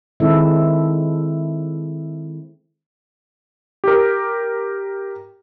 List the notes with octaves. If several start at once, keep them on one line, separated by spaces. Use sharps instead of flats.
D#3 G#3 C4 E4 A4 E5
G4 A#4